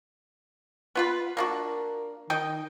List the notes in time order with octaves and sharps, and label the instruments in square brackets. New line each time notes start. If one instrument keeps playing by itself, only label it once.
[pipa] B3 F4 B4
[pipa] A#3 D4 F#4 [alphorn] A#4
[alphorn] D#3 [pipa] D#4 D#5 G5